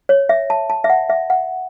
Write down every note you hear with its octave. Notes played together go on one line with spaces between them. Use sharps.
C#5
E5
A5
A5
E5
F#5
E5
F#5